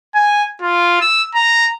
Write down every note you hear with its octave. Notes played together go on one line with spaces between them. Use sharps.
G#5
F4
E6
A#5